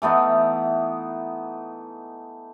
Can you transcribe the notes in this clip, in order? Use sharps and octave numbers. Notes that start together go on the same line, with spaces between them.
E3 A3 B3 D#4